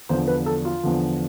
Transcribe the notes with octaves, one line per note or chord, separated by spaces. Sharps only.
E2 D3 F3 C5
B4
A4
F4
E2 D3 F3